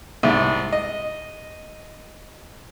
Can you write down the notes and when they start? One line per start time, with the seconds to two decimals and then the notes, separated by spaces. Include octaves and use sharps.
0.23 C2 G#2
0.72 D#5